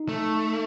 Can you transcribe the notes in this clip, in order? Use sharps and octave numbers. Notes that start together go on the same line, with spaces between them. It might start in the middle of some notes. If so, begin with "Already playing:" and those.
Already playing: D#4
A3